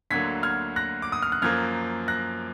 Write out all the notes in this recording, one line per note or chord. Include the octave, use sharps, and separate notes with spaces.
D2 D3 F#3 A#3 G#6 B6
F6 G#6
F#6 A#6
D6
D#6
F6
F#6
F#2 F3 A#3 F6 G#6
F#6 A#6